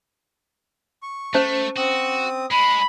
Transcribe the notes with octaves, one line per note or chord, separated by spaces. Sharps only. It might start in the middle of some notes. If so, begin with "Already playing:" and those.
C#6
A3 C#4 C5 A5
C4 F#4 D#6
G#3 B5